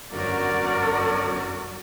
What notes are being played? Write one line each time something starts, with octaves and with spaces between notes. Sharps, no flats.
G1 F#2 F#3 F#4 A#4 D5